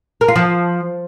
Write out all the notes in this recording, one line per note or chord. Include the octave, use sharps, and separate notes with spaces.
A#4
F4
F3